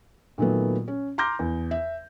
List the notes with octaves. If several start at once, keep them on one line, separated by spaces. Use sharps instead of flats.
A#2 D#3 F#3 A3 B3
C#4
A#5 C6 D6 F6 G6 A#6
E2
E5